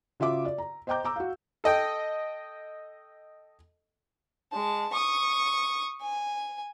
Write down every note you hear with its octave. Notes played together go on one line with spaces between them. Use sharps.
C#3 F4 F#4 E5 D6
D5
A#5
C5 D#5 G5 A#5 D6 G6
A#5 D6 E6
F#4 F5
A4 D#5 G5
G#3 A5
C#6 D#6
G#5